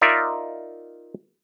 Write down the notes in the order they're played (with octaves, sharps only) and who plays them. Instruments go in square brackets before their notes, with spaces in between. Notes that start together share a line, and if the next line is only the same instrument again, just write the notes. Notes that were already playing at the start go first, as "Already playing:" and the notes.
[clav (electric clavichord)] D#4 F4 A#4 D5 E5